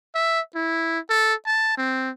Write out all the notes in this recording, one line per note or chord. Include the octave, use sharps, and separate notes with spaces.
E5
E4
A4
A5
C4